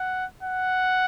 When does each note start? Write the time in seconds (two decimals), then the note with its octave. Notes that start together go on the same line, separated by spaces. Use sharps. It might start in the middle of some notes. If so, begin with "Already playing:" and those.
Already playing: F#5
0.43 F#5